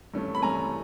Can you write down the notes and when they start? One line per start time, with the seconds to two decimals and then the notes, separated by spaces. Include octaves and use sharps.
0.14 G2 E3 A3 C#4
0.35 B5
0.42 G2 E3 A3 C#4 G#5 A#5